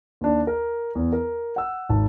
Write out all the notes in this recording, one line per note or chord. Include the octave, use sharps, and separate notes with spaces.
D#2 D4
A#4
E2
A#4
F#5 E6
G#1 A5